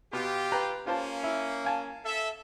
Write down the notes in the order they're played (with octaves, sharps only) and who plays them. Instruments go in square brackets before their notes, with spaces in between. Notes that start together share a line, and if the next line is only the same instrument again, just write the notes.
[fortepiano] B2 B3 [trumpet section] F4 G4
[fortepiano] B4 G5 A#5
[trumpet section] A#3 C#4 [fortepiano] F4 C5 A5
[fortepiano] E4
F5 G#5 A5
[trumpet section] A4 E5